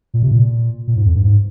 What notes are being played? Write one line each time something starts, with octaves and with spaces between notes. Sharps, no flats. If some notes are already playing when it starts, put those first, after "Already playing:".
A#2
C3
A#2
A#2
G#2
F2
G2
G#2